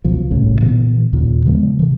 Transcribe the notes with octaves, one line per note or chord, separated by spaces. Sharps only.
C#2 B2 F3
G1 C2 A2 C#3
A#2 D3 E3 B3
D#2 A#2 C#3
C#3 F3 G#3 B3
C3 E3